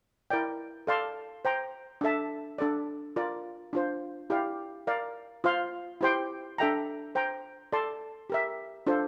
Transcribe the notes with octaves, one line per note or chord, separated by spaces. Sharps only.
E4 A#4 D5 G5
A4 D5 F5 A5 C6
C5 G5 A#5
D4 A4 E5 A5
D4 A4 D5
F4 A#4 D5
D4 F4 C5
E4 G4 D5 F5
A#4 D5 F5
F4 C5 F5 C6
E4 G4 C5 G5 C6
D4 A4 E5 G5 A#5
C5 G5 A#5
A4 D5 A5 C6
G4 A#4 E5
D4 F4 A4 C5